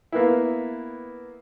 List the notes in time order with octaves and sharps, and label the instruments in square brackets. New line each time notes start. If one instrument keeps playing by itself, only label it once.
[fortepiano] A#3 B3 E4